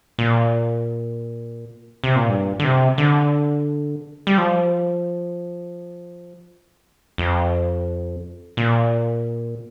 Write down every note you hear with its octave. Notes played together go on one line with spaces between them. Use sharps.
A#2
C3
A#2
G2
D3
C3
D3
G3
F3
F2
A#2